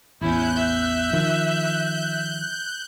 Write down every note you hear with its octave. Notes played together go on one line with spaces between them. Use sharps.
A1 E2 C#4 E4 F#6 G6
E5
D#3 F3